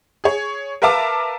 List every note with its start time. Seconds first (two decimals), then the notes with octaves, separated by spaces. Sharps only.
0.24 G#4 C#5
0.82 A#4 B4 E5 F5 A5 D6